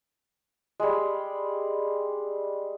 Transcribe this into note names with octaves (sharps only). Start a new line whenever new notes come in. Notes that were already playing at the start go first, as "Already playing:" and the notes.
G3 G#3